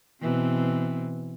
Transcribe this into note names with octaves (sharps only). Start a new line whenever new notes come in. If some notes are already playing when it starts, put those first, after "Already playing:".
B2 E3 C4